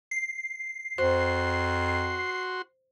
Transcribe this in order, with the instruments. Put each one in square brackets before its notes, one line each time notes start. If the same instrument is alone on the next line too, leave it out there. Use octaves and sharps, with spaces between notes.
[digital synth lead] C7
[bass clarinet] F2 [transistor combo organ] F#4 C6 [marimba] C5